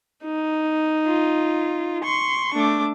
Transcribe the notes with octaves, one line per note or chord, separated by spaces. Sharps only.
D#4
F4
C6 C#6
A3 D4 D6